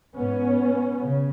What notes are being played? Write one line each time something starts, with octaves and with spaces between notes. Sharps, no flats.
G#2 B3 C#4
C#3